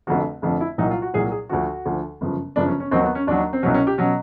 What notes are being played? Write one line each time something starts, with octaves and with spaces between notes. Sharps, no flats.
F1 F2 D3 F3 F#4
F1 F2 D3 F3
E4
C2 A#2 F#3 D#4
F4
F#4
C2 A#2 F#3 G#4
G#4
D2 D3 F3 F#4
D2 D3 F3
G1 F#2 C#3 F3
G1 F#2 C#3 F3 D4
C#4
C#4
D#2 D#3 F#3 C4
B3
C#4
D#2 D#3 F#3 D4
C4
C2 B2 F#3 C#4
C#4
G4
B2 F#3 C#4